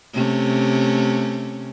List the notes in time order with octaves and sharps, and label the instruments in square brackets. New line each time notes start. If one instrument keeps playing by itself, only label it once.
[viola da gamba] C3 A3 C#4